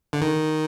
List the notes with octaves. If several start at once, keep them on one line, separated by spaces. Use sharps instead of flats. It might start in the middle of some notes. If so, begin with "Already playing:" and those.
D3
D#3